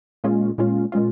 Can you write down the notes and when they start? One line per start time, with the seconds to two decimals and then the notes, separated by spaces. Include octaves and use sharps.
0.24 A#2 G#3 C#4 F4
0.58 A#2 G#3 C#4 F4
0.92 A#2 G#3 C#4 F4